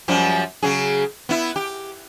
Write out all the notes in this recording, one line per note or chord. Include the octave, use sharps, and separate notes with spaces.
F#2 F3 G3
C#3 F#3 G#4
B3 E4
G4